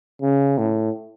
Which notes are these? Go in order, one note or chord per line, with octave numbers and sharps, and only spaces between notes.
C#3
A2